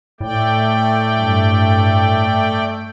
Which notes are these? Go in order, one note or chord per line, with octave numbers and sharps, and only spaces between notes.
A2 A3 D5 G5
G2